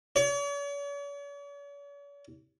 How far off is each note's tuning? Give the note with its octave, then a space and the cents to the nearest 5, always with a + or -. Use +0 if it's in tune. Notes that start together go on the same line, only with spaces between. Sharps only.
C#5 +45